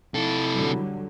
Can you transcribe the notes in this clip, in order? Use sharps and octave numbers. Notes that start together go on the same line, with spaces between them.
C3 E4 A4
D3 F#3 G3